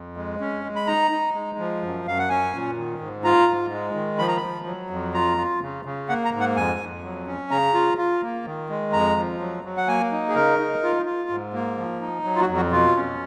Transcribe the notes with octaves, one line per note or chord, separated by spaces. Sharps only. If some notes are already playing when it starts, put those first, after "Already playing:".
Already playing: F2
G#3
C#4
G#3
B5
D#4 A#5
D#4
G#3
F3
F#2
F#2 F5
F#5
C#4 G#5
A#2
D#3
G#2
F4 A#5
G#2
G#3
D#3
F3 B5
A#5
F3 B5
F#3
F2
F4 A#5
F4
C#3
C#3
A#3 F#5
A#5
G#2
F#5
F2 G#5
F2
F#3
C#4
C#3 A#5
F4
F4
A#3
D#3
G#3
F2 A#5
F3
F#3
F#3
F#5
A#3 G#5
D#4
G#4
C#3 A#4
D#4
F4
F4
G#2
A#3
F3
D#4
F#3
F4
F#4
F2
F#4
B2 F4
C#4